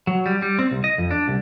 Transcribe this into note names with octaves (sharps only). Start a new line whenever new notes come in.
F#3
G3
G3
C4
C2
D#5
F2
D4
C2